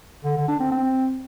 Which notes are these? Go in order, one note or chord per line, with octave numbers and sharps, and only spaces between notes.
D3
D3
D4
C4
C4